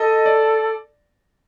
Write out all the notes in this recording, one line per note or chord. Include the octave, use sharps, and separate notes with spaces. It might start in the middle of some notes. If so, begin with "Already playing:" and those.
Already playing: A4 D#5
D5